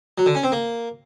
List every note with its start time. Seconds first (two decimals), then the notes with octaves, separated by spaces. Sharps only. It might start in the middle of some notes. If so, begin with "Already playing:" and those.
0.18 F#3
0.26 D3
0.35 C#4
0.44 C4
0.52 A#3